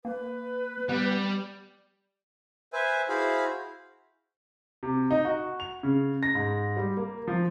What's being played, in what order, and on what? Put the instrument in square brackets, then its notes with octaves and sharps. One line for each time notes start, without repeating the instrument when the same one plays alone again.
[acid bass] A#3 [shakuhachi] B4
[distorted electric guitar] G3 [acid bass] B3
[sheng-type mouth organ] B4 C5 E5 G#5
E4 F#4 G#4 C5 F5 B5
[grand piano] C3
D#4
F#4
F7
C#3
A#6
G#2
G3
A#3
F3